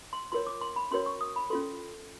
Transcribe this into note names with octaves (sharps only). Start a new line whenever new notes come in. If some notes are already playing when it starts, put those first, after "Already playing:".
C6
F4 A#4 C#5 C6
D6
C6
B5
C#4 F#4 A#4 C#5 C6
C#6
D#6
B5
C#4 F4 A4 C6